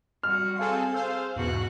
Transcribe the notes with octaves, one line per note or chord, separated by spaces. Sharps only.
G3 F#4 F6
C4 G#4 A4 F5 G#5 C6
G#4 C5 F5 E6
E2 G#2 B2 F#4 F#6